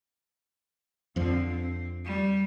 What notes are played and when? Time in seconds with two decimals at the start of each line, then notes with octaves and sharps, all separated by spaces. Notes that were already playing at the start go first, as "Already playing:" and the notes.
1.16 F2 D3 F3 C4
1.47 C4
2.05 G3